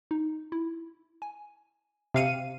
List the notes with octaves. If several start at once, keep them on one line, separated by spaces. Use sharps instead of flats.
D#4
E4
G#5
C3 F5 G5 C#7 D#7